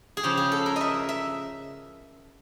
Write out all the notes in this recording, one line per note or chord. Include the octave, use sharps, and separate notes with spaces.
G#4
C#3 F3 G4
G#4
A4
A#4
D#5 E5
E5